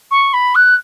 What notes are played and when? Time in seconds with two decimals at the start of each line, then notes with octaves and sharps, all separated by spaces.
0.11 C#6
0.33 B5
0.55 F#6